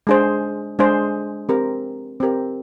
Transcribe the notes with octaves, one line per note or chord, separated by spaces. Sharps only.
G#3 D4 G#4 C5
G#3 D4 G#4 C5
C4 G4 A#4
C4 G4 A#4